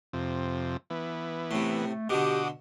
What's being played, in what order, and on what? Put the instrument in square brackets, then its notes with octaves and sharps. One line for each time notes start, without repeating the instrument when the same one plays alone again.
[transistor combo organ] F2 C3
E3 B3
[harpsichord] A2 C3 [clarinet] A3
[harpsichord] B2 D3 [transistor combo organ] F#4 D6 D#6 [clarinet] G4